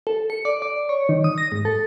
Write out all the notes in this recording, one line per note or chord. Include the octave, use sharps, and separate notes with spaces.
A4
C#7
D5
D5
C#5
D#3
D#6
A#6
G#2
A4